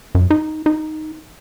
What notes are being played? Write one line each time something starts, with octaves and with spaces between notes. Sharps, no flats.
F#2
D#4
D#4